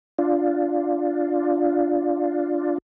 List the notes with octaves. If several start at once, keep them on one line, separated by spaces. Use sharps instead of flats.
D4 F4